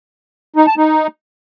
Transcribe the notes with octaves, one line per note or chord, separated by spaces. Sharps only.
D#4
A5
D#4